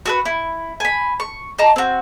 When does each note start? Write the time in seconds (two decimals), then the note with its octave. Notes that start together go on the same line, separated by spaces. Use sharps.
0.06 F#4 A4 B4
0.25 E4
0.80 G#5 B5
1.20 C#6
1.59 D#5 A5 A#5
1.76 C4 F#4